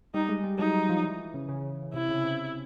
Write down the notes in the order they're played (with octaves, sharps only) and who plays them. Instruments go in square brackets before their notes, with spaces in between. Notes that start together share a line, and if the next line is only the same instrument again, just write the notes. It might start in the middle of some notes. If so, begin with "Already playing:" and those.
[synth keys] G3 [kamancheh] D#4
[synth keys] G#3
G3
[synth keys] F#3 [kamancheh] D#4
[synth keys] F#3
F3
E3
C#3
C#3
C#3
[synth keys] C3 [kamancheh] E4
[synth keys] C#3
C3